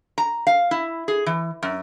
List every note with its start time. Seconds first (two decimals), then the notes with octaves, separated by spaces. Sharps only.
0.18 A#5
0.47 F5
0.71 E4
1.08 G#4
1.26 E3
1.63 F#2